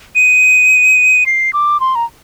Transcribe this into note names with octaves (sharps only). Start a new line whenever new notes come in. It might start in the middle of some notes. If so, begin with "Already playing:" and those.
D#7
C7
D6
C6
A#5